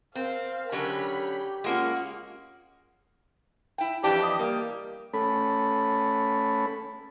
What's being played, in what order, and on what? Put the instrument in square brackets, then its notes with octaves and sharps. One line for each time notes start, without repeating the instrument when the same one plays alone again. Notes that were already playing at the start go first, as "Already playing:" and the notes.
[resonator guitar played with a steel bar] C4 [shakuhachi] A#4 [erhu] F5
[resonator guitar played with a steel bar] D3 F#3 C#4 [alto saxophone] G4 [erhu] B5
[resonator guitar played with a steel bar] G#3 A#3 C#4 [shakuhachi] F4 [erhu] F#5
[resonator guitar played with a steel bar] E4 G5
[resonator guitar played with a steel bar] F2 E3 D4 [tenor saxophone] G4
[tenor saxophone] D#5
[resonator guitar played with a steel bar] G3 [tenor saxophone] A#3
[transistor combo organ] A3 C#4 A4 B5